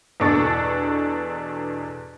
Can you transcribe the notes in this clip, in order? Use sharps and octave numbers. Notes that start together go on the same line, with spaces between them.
E2 B2 D4 A4 C#6 A6